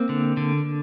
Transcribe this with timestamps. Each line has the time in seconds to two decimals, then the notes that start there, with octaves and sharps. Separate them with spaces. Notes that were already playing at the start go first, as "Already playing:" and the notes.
Already playing: A#3 C4
0.09 D3
0.37 D3